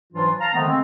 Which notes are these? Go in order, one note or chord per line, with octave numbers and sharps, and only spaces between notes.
G#2 E3 F#3 D4 F4
F5 A5 A#5
D3 D#3 F3 G#3 A3 B3
C#3 G#3 C4